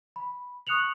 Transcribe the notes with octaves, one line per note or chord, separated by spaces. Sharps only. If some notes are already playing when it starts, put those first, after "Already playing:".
B5
C#6 D#6 F#6 C#7 F7 F#7